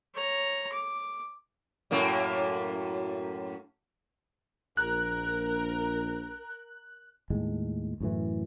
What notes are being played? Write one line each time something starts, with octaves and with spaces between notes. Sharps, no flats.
C#5 A#5
D6
F#2 A2 A#3
A#1 A#4 F#6
D#2 A2 G#3
F#2 A2 E3